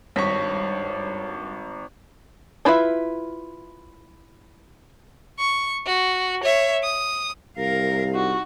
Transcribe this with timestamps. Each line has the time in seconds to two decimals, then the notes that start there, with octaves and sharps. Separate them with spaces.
0.16 G#1 G2 C#5 C#6 A#6 B6
2.65 D4 E4 F4 B4 E5
5.39 C#6
5.87 F#4
6.43 C#5 E5
6.83 D#6
7.58 C2 A#4 F5
8.15 D#4 F#4